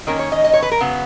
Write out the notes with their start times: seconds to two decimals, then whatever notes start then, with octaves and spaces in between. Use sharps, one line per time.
0.07 D#3 A#3 C#4 A#4
0.19 C#5
0.32 D#5
0.44 D#5
0.53 C#5
0.62 B4
0.72 A#4
0.81 C#3 F#3 B3